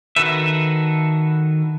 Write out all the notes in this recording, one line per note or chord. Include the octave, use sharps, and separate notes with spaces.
D#3 F#4 A4 B4 E5